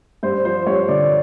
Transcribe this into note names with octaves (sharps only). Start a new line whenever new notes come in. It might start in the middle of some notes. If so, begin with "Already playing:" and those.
G2 C5
F3 C5
G2 C#5
D3 D5